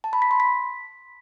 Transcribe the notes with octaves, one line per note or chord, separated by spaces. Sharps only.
A5
B5
B6
C6
B6